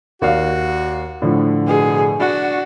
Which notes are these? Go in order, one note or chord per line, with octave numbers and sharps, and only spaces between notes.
D#2 F#4 D5 F5
A2 D3 F3
B2 G#4
D4 F#4